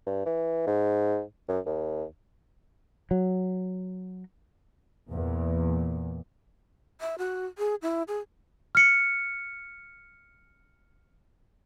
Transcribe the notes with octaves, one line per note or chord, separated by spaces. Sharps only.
G2
E3
G#2
F#2
D#2
F#3
E2 A#2
E5
F#4
G#4
E4
G#4
F6 C#7